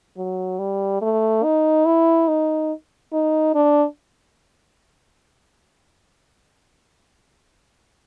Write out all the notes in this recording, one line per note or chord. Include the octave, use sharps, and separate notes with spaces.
F#3
G3
A3
D#4
E4
D#4
D#4
D4